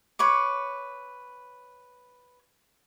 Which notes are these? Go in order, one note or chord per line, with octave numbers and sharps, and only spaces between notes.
B4 C#5 D6